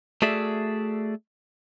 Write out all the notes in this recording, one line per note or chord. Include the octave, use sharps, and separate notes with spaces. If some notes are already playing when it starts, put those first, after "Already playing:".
A3 F#4 G#4 D5 E5